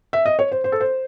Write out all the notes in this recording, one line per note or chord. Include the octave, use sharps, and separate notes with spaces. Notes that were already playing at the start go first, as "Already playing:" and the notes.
E5
D#5
C#5
C5
C5
A4
C5